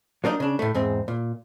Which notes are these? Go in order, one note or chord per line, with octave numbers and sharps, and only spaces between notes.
F#3 A#3 D4 D#4
C#3 D4
A2 A3
E2 G#2 C4
A#2